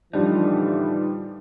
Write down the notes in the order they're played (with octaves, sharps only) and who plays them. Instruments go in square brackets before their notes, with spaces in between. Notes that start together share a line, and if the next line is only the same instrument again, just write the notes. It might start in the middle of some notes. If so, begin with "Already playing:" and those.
[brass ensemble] A2 D3 E3 [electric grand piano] F3 G3 D4 [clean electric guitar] D#4